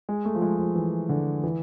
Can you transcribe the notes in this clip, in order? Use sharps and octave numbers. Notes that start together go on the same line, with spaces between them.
G#3
A3
F3
G#3
F3
E3
D3
E3